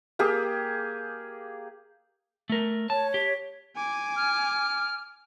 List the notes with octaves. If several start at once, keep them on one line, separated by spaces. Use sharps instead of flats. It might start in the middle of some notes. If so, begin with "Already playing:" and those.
A#3 G4 G#4
A3 A#4
C#5 A5
G4
G#5 D6
F6